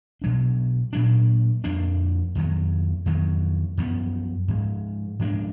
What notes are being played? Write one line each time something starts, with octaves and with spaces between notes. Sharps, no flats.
B2 F#3 D4
A#2 F#3 D4
F2 F3 A#3 D4
F2 D#3 F#3
F2 D#3 F#3
F#2 F3 B3
G#2 F3 G#3
G#2 F3 G#3 D4